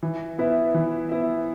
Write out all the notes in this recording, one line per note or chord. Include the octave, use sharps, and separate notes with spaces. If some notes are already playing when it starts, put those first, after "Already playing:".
E3
B3 E4 B4 E5
E3
B3 E4 B4 E5